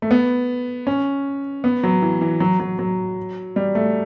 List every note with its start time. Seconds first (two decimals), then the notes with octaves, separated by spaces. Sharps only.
0.02 A3
0.11 B3
0.87 C#4
1.64 B3
1.83 F#3
2.02 E3
2.21 E3
2.40 F#3
2.60 F#3
2.79 F#3
3.56 G3
3.75 A3